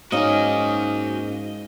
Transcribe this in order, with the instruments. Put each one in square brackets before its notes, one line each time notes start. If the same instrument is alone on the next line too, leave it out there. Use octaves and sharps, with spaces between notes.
[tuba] G#2 [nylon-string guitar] A#3 C#4 D#4 [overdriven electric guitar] F#4 G#5 [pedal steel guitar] D#5